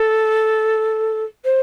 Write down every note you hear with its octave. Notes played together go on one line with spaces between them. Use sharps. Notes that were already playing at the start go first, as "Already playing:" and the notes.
Already playing: A4
C5